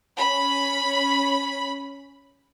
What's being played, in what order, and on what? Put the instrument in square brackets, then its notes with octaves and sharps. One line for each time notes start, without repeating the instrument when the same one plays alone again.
[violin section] C#4 B5